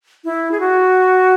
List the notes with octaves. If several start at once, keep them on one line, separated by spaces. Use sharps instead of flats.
E4
G#4
F#4